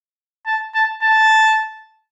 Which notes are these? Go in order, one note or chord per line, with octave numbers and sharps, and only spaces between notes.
A5
A5
A5